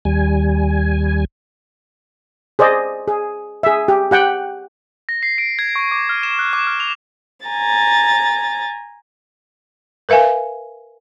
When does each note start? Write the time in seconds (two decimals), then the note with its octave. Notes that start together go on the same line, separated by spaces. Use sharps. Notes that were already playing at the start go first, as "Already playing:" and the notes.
0.05 D#2 G3 G#5
2.59 G#4 C5 D5 D#5
3.08 G#4
3.63 G#4 E5
3.88 G4
4.11 G4 F#5 G5
5.09 A#6
5.23 C7
5.38 D7
5.59 G#6
5.76 C#6
5.91 D6
6.09 F6
6.23 E7
6.39 F#6
6.53 D6
6.67 F6
6.80 F7
7.46 G#5 A#5 A6
10.09 A#4 B4 E5 F5 G#5